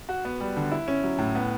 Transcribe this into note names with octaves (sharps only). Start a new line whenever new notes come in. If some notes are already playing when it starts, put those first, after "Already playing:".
F#4
B3
G3
D3
E4
C#4
F#3
A2
B3